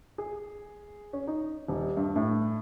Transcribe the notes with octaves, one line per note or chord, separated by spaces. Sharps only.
G#4
C#4
D#4
D#1
G2
A2